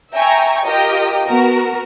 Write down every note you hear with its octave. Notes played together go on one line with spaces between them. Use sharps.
E5 G5 G#5 A#5 C#6
F4 G4 A#4 D#5 G5
B3 F#4 A#4